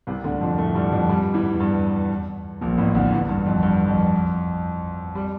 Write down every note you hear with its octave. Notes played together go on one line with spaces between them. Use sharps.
C2 C3
D2 D3
F2 F3
A2 A3
G2 G3
F2 F3
G2 G3
E2 E3
G2
A#1 A#2
A1 A2
D2 D3
E2 E3
G2
F2
G2
F2 F3
G3